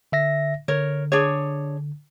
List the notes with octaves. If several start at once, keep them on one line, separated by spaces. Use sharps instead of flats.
D3 E5 A#6
D3 A#4 C#5
D4 G#4 C#5